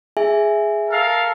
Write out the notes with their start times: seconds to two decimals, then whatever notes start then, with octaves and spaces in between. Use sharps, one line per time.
0.17 G#4 E5 G#5
0.90 A4 A#4 F5